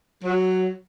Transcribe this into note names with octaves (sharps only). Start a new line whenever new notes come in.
F#3